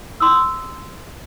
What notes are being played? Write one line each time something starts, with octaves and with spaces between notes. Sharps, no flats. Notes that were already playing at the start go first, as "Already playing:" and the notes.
C6 D#6 E6